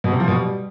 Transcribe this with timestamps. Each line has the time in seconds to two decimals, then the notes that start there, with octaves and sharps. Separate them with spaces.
0.04 B2
0.12 C3
0.20 F3
0.28 B2
0.36 G3